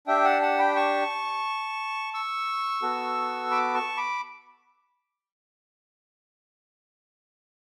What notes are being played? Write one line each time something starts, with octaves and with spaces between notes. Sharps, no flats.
D4 G4 E5 G5
F#5 A5
F#5 A5
G5 B5
A5 C#6
C#6 E6
B3 F#4 A4
B5 D6
A5 C#6
B5 D6